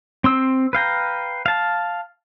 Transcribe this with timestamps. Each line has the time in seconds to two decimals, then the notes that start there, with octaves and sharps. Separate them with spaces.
0.24 C4 C6 E6
0.73 B4 F5 G5 A#5
1.46 F5 A5